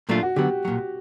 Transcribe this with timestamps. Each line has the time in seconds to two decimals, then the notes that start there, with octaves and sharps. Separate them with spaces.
0.09 A#2 F#3 A3 D4 F4
0.23 F#4
0.36 D3 F#3 B3 G4
0.65 B1 A#2 F#3